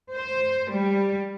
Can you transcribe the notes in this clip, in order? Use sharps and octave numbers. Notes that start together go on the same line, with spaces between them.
C5
G3